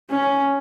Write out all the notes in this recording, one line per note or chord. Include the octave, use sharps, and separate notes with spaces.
C#4